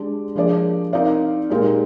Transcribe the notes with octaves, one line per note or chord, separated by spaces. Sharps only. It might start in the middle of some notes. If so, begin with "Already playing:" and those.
Already playing: G#3 D4 G4 D5
F3 A#3 D4 G#4 D5
C4 D#4 A#4 D5 F5
A#2 G#3 D#4 G4 A#4